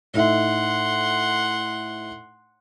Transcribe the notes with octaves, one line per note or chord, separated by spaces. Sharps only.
A2 D#4 E5 F#5 C6